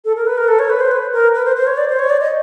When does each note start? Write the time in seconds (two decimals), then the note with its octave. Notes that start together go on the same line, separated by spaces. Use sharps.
0.05 A4
0.16 A#4
0.27 B4
0.37 A#4
0.48 A4
0.59 C#5
0.70 B4
0.81 C5
0.91 B4
1.13 A#4
1.35 B4
1.45 C5
1.56 C5
1.67 C#5
1.77 D5
1.89 C5
1.99 C#5
2.10 D5
2.21 D#5